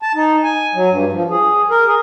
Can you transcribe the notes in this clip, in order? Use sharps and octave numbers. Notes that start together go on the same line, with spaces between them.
A5
D#4
G#5
F#3
G2
F3
G#4
A#4
G#4